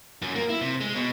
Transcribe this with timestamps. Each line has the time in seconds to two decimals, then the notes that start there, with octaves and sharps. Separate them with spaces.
0.22 F#2
0.35 A#3
0.49 E4
0.61 C3
0.81 G#3
0.94 B2